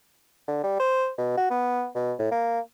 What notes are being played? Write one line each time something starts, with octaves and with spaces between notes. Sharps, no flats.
D3
G3
C5
B2
F#4
B3
B2
A2
A#3